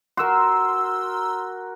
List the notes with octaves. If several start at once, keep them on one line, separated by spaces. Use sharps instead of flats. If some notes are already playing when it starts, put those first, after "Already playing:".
F#4 A#4 C6 E6